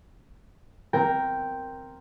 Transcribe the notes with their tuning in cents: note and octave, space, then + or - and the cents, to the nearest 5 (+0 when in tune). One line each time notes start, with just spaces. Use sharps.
C4 +0 A#4 +0 G5 +0